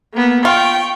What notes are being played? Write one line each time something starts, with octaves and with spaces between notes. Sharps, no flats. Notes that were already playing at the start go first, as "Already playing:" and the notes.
A#3 B3
F4 G5 C#6